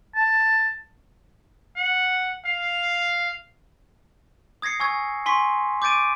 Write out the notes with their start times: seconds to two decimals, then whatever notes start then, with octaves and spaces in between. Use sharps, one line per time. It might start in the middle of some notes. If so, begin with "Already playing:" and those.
0.15 A5
1.76 F#5
2.46 F5
4.62 D#6 G#6 A#6 C7 C#7
4.80 G#5 C#6 E6 G#6
5.26 G#5 C6 C#6 B6
5.82 D6 G6 A6 D7 D#7